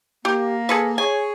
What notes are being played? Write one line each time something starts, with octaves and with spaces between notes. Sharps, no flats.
A#3 G4
G#4 A4 B4
G#4 C#5 G#5